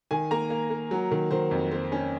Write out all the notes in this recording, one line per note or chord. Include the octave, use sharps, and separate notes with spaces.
D#3 G#5
A#3 A#5
A#3
A#3
F#3
D#3
D#3 C5
F2
A#3 C5
C#4